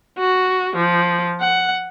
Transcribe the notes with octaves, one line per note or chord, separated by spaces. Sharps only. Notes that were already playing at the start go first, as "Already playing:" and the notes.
F#4
F3
F#5